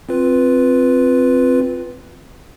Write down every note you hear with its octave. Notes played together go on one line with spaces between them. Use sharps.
C4 F4 B4